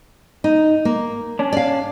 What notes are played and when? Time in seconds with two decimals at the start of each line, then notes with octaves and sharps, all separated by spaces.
0.44 D#4
0.85 A#3
1.39 C#4 D4
1.53 D5 F5